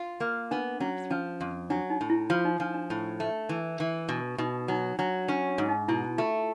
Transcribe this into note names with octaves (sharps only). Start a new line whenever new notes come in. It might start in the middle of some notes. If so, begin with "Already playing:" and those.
Already playing: F4
A#3
B3 D4
F#3 C#4
F3 C#4
F2
F#3 D4
D#4
A2
E4
F3 F4
D#4
F3 D4
D4
A2
A3
E3
E3
B2 D4
B2 D#4
F#3 D#4
F#3 D4
C#4 D4
D4
G#2
D#4
B2 E4
A3 F4